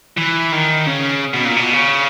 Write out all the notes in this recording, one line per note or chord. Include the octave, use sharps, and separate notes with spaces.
E3
D#3
C#3
B2
A#2
B2
C#3